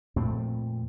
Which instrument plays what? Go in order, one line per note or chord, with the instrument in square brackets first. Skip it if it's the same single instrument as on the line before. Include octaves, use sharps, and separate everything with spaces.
[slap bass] F2 A#2 A3 C4